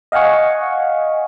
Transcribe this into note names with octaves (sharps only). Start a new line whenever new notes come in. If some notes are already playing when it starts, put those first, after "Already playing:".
D#5 F5 F#5 G#5 C#6